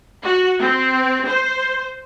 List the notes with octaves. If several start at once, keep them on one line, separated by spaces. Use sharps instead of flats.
F#4
C4
C5